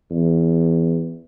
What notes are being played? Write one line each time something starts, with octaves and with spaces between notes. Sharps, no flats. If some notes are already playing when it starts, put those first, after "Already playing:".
E2